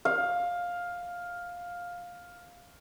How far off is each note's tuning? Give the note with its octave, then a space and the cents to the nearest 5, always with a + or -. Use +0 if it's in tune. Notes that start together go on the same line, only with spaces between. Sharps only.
F5 +10